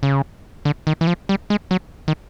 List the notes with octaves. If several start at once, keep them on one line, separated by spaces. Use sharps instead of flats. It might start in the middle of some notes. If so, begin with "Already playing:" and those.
C#3
D3
D#3
E3
F3
G3
G#3
F#3
D#3